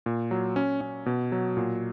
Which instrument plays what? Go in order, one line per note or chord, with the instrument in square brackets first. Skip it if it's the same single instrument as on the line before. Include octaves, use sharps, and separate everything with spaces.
[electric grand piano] A#2
F#3
C#4
C#4
B2
F#3
A#2